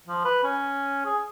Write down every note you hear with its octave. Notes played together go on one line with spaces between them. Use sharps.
F3
B4
C#4
G#4